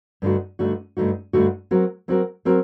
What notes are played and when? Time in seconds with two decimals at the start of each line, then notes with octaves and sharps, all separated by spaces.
0.22 G2 D3 A3 D#4 F#4
0.59 G2 D3 A3 D#4 F#4
0.97 G2 D3 A3 D#4 F#4
1.33 G2 D3 A3 D#4 F#4
1.71 F#3 C4 F#4 A#4
2.08 F#3 C4 F#4 A#4
2.45 F#3 C4 F#4 A#4